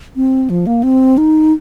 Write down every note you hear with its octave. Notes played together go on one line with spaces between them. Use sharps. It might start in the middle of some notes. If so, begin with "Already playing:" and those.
C4
F3
A#3
C4
D#4